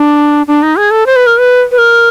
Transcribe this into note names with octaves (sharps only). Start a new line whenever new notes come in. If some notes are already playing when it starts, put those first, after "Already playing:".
Already playing: D4
D4
D#4
G#4
A4
C5
B4
A#4
B4
B4
A#4